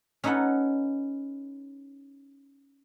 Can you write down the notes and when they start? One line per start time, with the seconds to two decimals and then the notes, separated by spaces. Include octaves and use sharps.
0.24 C#4 D#4 A4 B4 F#5